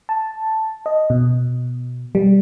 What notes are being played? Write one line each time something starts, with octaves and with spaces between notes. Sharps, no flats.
A5
D#5
B2
G3